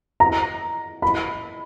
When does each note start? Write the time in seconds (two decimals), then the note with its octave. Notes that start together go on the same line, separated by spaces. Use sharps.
0.20 A#5
1.02 B5